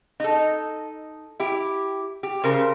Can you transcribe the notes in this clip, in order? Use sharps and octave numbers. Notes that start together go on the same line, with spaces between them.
D#4 A4
E4 G4
G4
C#3 A#4 C5